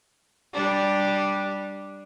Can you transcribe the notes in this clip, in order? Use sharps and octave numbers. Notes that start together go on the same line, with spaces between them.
G3 D4